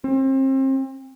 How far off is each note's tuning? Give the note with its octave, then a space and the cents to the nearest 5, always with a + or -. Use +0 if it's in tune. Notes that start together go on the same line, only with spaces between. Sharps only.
C4 +35